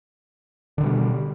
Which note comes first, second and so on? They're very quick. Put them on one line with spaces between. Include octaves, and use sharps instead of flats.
D3 D#3 B2 G3